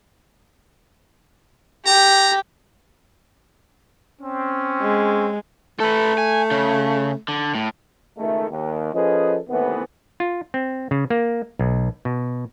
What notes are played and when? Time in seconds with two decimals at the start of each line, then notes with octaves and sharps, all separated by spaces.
1.86 G4 A#5
4.20 C4 C#4
4.81 G#3
5.80 A3 A4 B4
6.18 G#5
6.51 C#3
7.28 D3
7.55 A2
8.17 C#2 D#3 G#3 A3
8.50 D#2
8.93 F3 C#4 G#4 A4 B4 D#5
9.49 D#2 A2 C3 E3 B3
10.20 F4
10.54 C4
10.91 C#3
11.10 A#3
11.59 B1
12.05 B2